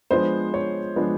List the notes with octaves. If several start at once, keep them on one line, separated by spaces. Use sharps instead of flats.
F3 G#3 B3 D4 C5
C#5
F3 G#3 B3 D4